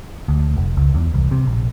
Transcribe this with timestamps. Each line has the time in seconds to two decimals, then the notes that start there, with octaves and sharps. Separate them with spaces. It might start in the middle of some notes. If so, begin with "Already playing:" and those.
0.28 D2
0.57 F1
0.77 C#2
0.94 E2
1.14 C2
1.31 C3
1.46 A#1